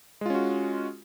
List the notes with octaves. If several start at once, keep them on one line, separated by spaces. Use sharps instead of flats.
G#3 C#4 F4 F#4